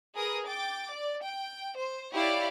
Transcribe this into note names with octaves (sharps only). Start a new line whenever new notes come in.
G#4 A#4 B4 D#6
G5 D6 A6
D5
G5
C5
E4 G4 C#5 D5 F5